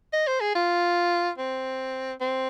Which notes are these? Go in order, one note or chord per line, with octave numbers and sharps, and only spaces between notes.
D#5
C5
G#4
F4
C4
C4